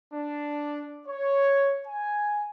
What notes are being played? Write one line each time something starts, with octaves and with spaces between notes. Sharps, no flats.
D4
C#5
G#5